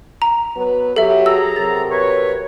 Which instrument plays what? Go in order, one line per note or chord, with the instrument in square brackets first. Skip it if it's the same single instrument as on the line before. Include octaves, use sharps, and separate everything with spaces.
[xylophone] A#5
[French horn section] F#3 B3 B4
[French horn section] F#3 G4 [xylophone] A4 E5
[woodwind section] G#4 A4 A#5 [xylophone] E6
[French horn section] C3 F#3 A#4 [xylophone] A6
[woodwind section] B4 C#5